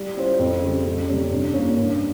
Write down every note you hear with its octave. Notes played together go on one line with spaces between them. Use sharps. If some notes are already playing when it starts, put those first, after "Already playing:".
Already playing: G3
C#4 F4 C5
F2
C#3 G3
F2
C3 G3 C#4
G2
G3 A#3 C#4
G2